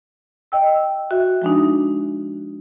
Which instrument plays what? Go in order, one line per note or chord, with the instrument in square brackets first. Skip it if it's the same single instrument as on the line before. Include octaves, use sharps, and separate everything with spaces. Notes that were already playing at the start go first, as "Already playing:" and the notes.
[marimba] D#5 G5 E6
F#4 E5
F3 G#3 D4 D#4